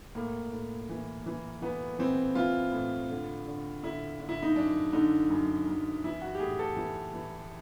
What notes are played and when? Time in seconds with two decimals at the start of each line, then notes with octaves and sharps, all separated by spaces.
0.15 A2 A#3
0.52 A2
0.89 E3
1.26 E3
1.62 E3 B3
1.99 E3 C4
2.35 E3 F4
2.72 A2
3.10 D3
3.47 D3
3.83 D3 E4
4.20 D3
4.29 E4
4.42 D#4
4.56 F#2 D4
4.93 D3 D#4
5.30 F#2
5.67 F#2
6.04 E3 E4
6.22 F#4
6.35 G4
6.40 A2 G#4
6.59 A4
6.76 E3
7.14 E3